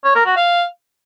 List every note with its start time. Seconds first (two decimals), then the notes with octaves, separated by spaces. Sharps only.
0.04 C#5
0.15 A#4
0.26 F#4
0.36 F5